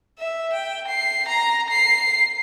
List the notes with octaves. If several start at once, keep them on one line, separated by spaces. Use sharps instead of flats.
E5
G5
C7
A#5
C7